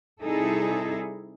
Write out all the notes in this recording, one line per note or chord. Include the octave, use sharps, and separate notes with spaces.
C3 G3 D#4 E4 G#4 A4